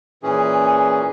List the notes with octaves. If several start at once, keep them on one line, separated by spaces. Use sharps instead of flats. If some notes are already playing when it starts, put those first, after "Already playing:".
A#2 E3 C#4 G#4